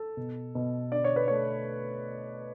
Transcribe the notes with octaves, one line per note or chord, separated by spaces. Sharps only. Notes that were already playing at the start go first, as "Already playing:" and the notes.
Already playing: A4
B2
B2
D3 D5
C#5
B4
A3 C#5